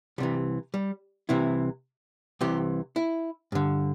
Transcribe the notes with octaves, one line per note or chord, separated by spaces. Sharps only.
C2 C3 E3 G3
G3
C2 C3 E3 E4
C2 C3 E3 G4
E4
G2 D3